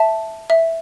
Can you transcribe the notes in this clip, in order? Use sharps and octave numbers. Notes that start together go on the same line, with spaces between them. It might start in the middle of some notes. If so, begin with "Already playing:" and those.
Already playing: E5 A5
E5